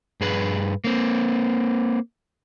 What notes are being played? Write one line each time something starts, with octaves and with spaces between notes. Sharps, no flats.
G2 G#4 B4
A#3 C4